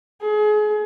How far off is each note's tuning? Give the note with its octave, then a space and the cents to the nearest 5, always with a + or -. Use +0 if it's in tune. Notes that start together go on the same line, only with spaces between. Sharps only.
G#4 +30